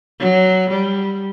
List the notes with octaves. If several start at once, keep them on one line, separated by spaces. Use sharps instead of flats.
F#3
G3